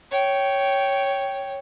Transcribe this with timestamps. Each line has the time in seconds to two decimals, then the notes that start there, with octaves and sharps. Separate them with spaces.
0.11 C#5 G5